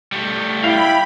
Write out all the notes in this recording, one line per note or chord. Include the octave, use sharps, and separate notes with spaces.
G3 A3
E4 F5 G5 B5